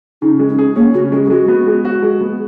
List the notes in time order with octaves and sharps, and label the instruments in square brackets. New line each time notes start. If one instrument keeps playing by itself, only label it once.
[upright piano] C#3 [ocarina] D#4
[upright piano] G#3
[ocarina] C#4
[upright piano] G#4
[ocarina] A#3 [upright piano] C#4
[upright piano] C#3 [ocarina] F#4
[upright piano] G#3 [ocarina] G#4
[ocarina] G#4
[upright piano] G#3 [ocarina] F#4
[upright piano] B3
G#3
F#4
G#3
B3